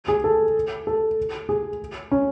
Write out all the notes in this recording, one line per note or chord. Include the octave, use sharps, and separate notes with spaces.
G#4
A4
A4
G#4
C#4